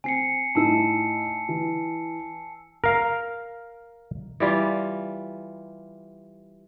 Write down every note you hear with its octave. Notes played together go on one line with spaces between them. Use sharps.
C4 G#5 C7 C#7
A2 D#4 E4 A5 E6 C#7
E3
A#4 F5
E3 G3 F4